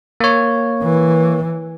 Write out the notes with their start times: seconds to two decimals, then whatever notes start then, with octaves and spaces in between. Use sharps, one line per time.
0.20 A#3 C#5
0.83 E3